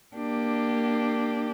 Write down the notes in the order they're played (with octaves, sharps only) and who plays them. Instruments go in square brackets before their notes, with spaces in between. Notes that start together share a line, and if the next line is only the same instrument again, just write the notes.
[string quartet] A#3 D4 G4